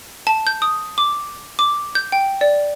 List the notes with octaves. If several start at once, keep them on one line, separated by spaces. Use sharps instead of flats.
A5
G6
D#6
D6
D6
G6
G5
D5